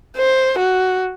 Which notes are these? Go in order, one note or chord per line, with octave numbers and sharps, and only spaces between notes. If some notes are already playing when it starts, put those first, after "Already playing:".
C5
F#4